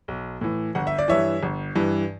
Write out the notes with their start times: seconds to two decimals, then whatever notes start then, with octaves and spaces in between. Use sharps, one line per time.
0.08 B1
0.41 A2 E3
0.75 G1 F#5
0.87 E5
0.98 D5
1.08 G2 E3 C#5 E5
1.43 G1
1.75 G2 E3